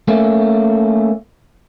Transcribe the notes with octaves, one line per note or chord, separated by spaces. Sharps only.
A3 A#3 C#4